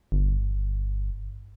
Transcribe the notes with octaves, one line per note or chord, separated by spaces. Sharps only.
G1